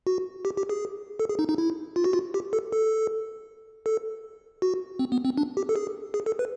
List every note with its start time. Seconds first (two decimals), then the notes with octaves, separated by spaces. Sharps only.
0.07 F#4
0.45 G4
0.57 G4
0.69 G#4
1.19 A4
1.29 G#4
1.39 D#4
1.49 D#4
1.58 E4
1.96 F4
2.04 F#4
2.13 F4
2.34 G4
2.53 A4
2.72 A4
3.86 A4
4.62 F#4
4.99 C4
5.12 B3
5.25 C4
5.37 D4
5.57 G4
5.69 A4
5.76 G#4
6.14 G#4
6.26 A4
6.39 B4